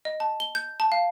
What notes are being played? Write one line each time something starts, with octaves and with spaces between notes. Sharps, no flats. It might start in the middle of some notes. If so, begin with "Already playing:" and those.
D#5
A5
G7
G6
A5
F5